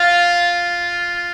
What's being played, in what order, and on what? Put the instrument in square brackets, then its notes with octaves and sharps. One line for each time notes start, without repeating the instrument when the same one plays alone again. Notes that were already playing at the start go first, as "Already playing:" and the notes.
Already playing: [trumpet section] F4 [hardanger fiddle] F5